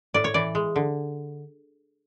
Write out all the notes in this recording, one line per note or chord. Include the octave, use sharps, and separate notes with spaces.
A2 D5
C#5
E3 D5
G#3
D3